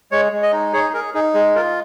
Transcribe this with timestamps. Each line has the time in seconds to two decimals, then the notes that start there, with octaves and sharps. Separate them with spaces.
0.12 G#3 C#5
0.32 G#3
0.42 D#5
0.52 D#4
0.73 G#4 C#5
0.93 G#4 A#4
1.14 D#4 G#4
1.34 G#3 G#4
1.55 F4 A#4